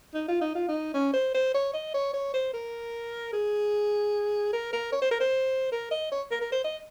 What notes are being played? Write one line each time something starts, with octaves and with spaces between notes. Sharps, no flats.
D#4
F4
D#4
F4
D#4
C#4
C5
C5
C#5
D#5
C#5
C#5
C5
A#4
G#4
A#4
A#4
C#5
C5
A#4
C5
A#4
D#5
C#5
A#4
A#4
C5
D#5